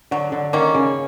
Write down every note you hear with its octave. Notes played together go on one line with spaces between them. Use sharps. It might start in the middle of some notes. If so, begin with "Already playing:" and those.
D3 F#3
D3
D#3 A#3 C#4
C#3